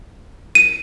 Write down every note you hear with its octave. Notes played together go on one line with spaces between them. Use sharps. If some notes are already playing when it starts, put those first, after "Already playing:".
D#7